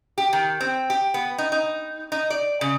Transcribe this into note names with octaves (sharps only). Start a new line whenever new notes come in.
G4
D#3
C4
G4
B3
D#4
D#4
D#4
D5
C#3